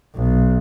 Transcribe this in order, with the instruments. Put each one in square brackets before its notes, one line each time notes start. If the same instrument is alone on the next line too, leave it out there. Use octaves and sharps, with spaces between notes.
[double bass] B1